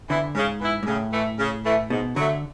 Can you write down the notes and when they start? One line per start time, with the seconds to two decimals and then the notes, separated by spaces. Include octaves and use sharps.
0.10 D3 E3 B3 E4
0.35 G#2 C#3
0.61 E3 B3 E4
0.83 G#2
0.87 A2 C#3
1.13 E3 A3
1.39 C#3
1.65 E3 A3
1.90 G#2 B2
2.16 D3 F#3 A3